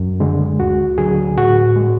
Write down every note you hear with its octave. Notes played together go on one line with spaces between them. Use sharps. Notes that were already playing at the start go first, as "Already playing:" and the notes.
Already playing: F#2
D3 G#3
D2 F#4
D3 F#3 G#4
A2 F#4
G#3